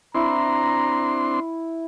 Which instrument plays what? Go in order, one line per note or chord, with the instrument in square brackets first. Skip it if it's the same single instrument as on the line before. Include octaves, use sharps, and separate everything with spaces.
[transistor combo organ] C4 D4 C6 [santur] E4 [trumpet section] A#5